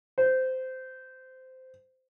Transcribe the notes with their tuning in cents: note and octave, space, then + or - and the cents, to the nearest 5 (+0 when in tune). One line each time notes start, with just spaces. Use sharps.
C5 -15